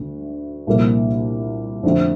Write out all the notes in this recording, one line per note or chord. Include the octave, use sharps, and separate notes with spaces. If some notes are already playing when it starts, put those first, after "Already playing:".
Already playing: D2 D3 A3
C2 A#2 F3 A#3
F2 D3 A3 C4